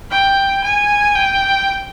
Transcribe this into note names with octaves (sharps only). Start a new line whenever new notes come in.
G5
G#5
G5